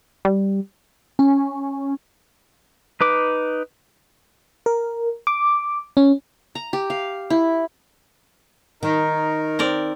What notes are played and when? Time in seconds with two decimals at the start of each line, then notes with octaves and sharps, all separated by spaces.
0.25 G3
1.19 C#4
3.01 D#4 B4 D6
4.66 A#4
5.27 D6
5.97 C#4
6.55 A#5
6.73 G4
6.90 F5
7.30 E4
8.83 D#3 D#4 A#4
9.59 C4 A#4 D5